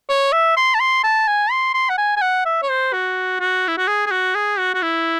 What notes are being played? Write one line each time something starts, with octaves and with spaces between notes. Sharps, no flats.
C#5
E5
C6
A5
C6
A5
G#5
C6
C6
F#5
G#5
G#5
F#5
E5
C#5
C5
F#4
F#4
E4
F#4
G#4
G#4
F#4
G#4
F#4
F#4
E4